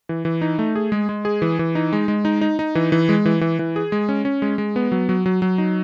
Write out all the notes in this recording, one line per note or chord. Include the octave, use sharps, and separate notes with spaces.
E3
E3
D#4
A3
G#4
G#3
G#3
G#4
E3
E3
D#4
G#3
G#3
D#4
D#4
D#4
E3
E3
G#3
E3
E3
E3
G#4
G#3
C#4
C#4
G#3
G#3
B3
F#3
F#3
F#3
F#3
D#4